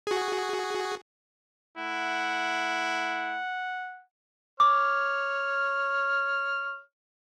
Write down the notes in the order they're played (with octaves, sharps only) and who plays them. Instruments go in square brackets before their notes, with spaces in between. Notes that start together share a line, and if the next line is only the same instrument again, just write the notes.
[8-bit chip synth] F#4 G#4
[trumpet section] A3 E4 [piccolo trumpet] F#5
[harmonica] C#5 F6 [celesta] D6